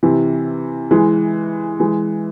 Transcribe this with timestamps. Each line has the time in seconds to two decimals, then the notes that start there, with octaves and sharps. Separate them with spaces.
0.03 C3 E3
0.91 E3 G#3
1.80 E3 G#3